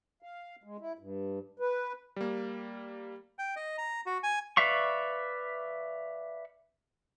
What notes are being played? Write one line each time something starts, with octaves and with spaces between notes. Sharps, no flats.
F5
G#3
E4
G2
B4
G3 A#3
G5
D#5
A#5
F#4
G#5
B4 D5 E5 F5 C#6